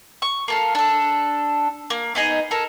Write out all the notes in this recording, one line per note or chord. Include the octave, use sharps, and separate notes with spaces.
C#6
A#3 A4 F5
D4 A4
A#3
B3 D#4 G#4 D#5
A4 A#4